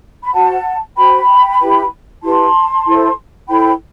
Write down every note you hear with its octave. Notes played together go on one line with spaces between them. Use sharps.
B5
F#4 C5 F#5 A5
F#4 C5 G5 B5
E4 G4 B4
E4 G4 B4 A5 C6
E4 A4 C5
E4 A4 C5 G5 B5